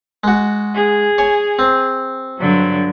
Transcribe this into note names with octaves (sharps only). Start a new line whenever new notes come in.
G#3 F#4
G#4
C#5 G#5
C4
G2 D3 F#3